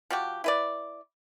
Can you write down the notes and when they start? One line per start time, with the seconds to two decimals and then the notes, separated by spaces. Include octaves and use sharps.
0.10 F3 F#4 G4
0.44 E4 B4 D5